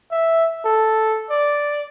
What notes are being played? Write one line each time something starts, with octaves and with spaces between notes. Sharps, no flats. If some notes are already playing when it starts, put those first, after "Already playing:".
E5
A4
D5